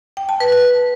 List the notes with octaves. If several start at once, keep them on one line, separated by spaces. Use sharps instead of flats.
G5
A5
B4
B4